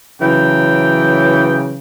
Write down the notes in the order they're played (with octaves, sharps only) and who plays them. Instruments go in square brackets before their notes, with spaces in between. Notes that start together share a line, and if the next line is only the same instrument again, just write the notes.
[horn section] C#3 E3 F#3 [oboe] G5